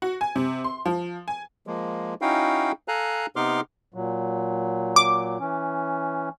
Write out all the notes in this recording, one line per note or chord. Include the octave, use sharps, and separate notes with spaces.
F#4
G#5
C3
C6
F3
G#5
F3 G#3 A#3
C#4 D#4 E4 F#4 F5 G5
A4 F5 G#5 A#5 F#6
C3 B3 D#4 C6 D6 F6
A#2 F#3
D6
E3 C#4